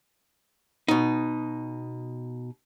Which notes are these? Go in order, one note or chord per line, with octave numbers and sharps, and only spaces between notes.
B2 D#4